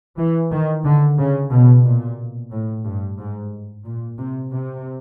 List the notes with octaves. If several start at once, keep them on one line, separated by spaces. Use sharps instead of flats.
E3
D#3
D3
C#3
B2
A#2
A2
G2
G#2
A#2
C3
C3